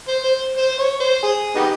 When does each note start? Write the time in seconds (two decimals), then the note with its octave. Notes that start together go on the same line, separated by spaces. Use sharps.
0.08 C5
0.24 C5
0.57 C5
0.78 C#5
1.00 C5
1.23 G#4
1.55 B3 D#4 G4